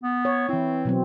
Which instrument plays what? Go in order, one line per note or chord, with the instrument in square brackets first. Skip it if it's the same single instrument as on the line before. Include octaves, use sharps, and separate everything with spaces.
[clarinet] B3
[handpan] C#5
[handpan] E3 E4 [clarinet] C4
[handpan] B2 F#3 C4